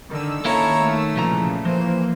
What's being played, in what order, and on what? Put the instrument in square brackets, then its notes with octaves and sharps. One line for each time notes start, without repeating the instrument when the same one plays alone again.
[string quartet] D3 [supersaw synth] D#3 E6
[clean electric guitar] A#3 C#4 E4 [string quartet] A4 C#5 A#5
[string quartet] A3
[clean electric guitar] C2 F3 A#5 [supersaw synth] A#2 C#3 E3
[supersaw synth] E3 A#3 [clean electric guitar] F3 [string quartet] C5